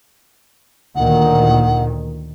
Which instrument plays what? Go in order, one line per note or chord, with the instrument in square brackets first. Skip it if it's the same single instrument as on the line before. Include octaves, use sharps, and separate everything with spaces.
[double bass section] D2 A#2 D#3 [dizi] F#5